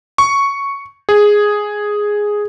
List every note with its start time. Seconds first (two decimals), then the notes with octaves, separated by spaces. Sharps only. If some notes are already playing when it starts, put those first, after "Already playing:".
0.18 C#6
1.09 G#4